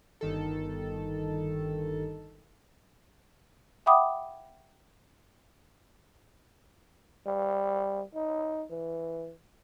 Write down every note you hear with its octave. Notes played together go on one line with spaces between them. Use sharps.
G1 D#3 A4
E5 F#5 G5 B5 D6 D#6
G3
D#4
E3